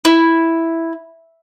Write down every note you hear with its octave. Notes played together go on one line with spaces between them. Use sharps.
E4